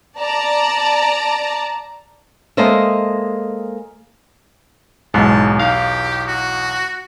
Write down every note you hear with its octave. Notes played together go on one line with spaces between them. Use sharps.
D5 A5 A#5
G#3 A#3 A4 C5 D#5 E5
B1 E2 G#2 A5
G4 F5
F#4